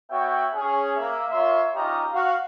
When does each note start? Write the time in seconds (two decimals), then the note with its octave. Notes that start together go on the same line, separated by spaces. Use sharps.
0.10 B3 F#4 C#5 E5 G5
0.55 C#4 G#4
0.97 A#3 E5
1.30 A#3 F4 C#5 E5 C6
1.75 C#4 D#4 F4 G4 D#5 A#5
2.13 F#4 F5